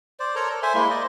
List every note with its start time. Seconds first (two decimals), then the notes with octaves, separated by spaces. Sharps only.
0.20 C5 D5
0.36 A4 A#4 C#5 A#5
0.50 A4
0.63 C5 E5 G#5
0.75 G#3 A#3 E4 C6
0.90 C5 D5 D#5